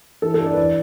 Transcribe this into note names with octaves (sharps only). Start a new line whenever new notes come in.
E3 A4
A4
D4
D5
B4
E3 D5